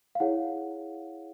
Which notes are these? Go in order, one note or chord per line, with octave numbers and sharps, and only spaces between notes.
F5
E4 G#4 C#5 F#5